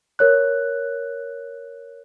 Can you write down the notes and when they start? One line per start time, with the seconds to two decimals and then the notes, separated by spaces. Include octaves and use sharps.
0.19 A#4 C#5 F#6